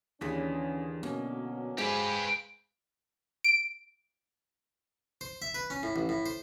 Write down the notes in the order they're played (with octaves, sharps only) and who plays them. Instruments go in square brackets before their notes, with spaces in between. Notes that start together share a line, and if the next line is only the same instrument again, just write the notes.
[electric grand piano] D#2 G#4 B6 [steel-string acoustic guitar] D3 E3 [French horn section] C#4
[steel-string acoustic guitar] B2 [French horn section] D3 F#3 [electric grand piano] A#3 C#4
[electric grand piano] G#3 C7 [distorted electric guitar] G4 B4 [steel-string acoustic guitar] C5 F5 G#5
[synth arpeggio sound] D7
[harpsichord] C5
E5
B4
C#4
A2
A1
A2
C5